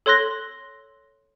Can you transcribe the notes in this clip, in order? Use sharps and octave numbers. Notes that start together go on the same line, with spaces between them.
A4 C#5 C6 F#6 A#6 G7